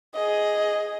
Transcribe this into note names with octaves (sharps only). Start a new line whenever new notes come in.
G#4 D#5